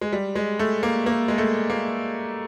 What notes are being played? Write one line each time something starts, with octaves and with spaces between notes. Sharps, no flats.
G#3
G3
G#3
A3
A#3
A#3
G#3
A3
A#3